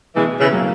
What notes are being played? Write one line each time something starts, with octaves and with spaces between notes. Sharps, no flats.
B2 E3 G#3
C#3 E3
F#3 A#3